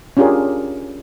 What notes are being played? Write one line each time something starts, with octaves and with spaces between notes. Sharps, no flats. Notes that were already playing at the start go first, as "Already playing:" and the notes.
C#4 D4 F4 G4 G#4 A#4